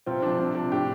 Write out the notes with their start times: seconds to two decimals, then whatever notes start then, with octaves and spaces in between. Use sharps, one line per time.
0.06 C3 C4 F4
0.22 F3 D4
0.39 C3 D4
0.55 F3 D4
0.71 A2 D4 G4